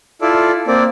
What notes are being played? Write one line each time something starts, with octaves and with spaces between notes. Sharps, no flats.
E4 F4 A4 D5
A#3 C4 D5